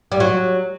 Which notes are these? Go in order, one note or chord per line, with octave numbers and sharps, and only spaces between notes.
G3
F#3